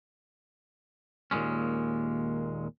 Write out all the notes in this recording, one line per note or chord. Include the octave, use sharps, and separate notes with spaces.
D#2 A#2 C#3 G#3 C#4